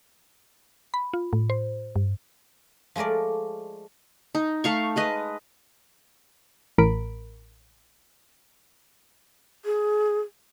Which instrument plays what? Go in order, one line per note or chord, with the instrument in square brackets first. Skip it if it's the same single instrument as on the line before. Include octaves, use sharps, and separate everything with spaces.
[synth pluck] B5
F4
A2
C5
G2
[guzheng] F3 G#3 A3 A#4 D5
[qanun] D#4
A3 F5 C#6
G#3 B4 D#5
[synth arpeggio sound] A1 A2 A#4 B5 D7
[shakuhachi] G#4